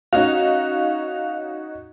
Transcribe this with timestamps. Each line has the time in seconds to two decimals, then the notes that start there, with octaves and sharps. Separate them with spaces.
0.13 C#4 D#4 F#4 F5